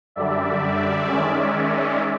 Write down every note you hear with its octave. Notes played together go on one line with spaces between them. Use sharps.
F#2 D3 G3 D5 E5
D#3 G#3 C#4